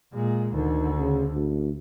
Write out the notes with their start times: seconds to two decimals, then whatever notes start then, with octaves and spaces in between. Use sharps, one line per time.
0.13 A#2 G#3
0.54 D2 D3 D#3
0.99 C#3
1.34 D2